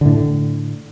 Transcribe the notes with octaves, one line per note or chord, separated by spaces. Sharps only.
A2 D3